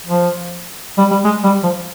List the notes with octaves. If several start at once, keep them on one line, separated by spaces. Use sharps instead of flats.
F3
G3
G3
G#3
G3
F3